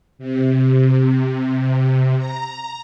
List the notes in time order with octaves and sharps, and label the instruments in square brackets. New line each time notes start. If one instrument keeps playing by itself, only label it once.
[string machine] C3
A#5